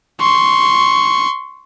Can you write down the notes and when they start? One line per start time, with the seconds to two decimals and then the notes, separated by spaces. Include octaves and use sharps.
0.21 C6 C#6